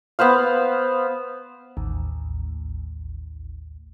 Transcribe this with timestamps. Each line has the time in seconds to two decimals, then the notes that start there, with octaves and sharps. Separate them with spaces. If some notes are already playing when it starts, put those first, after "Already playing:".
0.19 B3 B4 C5 F5
1.77 A1 D#2